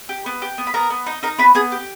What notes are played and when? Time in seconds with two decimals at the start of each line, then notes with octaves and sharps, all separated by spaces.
0.09 G4
0.26 B3
0.42 G4
0.58 B3
0.67 B5
0.74 B3 A#4 A#5
0.90 B3
1.06 D#4
1.23 D#4 A#4 A#5
1.39 B3 B4 B5
1.55 B3 G#4 G#5
1.72 G4